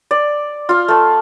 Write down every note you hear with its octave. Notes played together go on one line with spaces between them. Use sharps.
D5
F4 F5
A3 A5